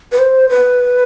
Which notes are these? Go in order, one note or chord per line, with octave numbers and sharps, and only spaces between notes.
B4
C5
B4